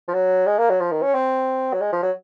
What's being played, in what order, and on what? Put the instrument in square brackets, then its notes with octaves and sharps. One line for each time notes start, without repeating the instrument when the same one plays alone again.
[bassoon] F3
F#3
G#3
A#3
F#3
F3
D#3
C#4
C4
F#3
G#3
F3
F#3